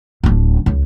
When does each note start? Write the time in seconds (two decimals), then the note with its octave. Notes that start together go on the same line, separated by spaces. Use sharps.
0.24 D1 D4
0.66 C#2